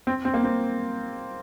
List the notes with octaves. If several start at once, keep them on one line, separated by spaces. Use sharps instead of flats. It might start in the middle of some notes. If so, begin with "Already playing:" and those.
C4
C4
A#3
C4